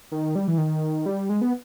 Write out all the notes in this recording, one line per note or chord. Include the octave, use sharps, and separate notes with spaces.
D#3
G3
E3
D#3
G3
G#3
B3